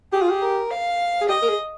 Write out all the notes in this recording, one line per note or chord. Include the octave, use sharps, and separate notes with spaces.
G4 G#4
F4
G4
A#4
F5
G#4
G4 D#5
A#4
G#4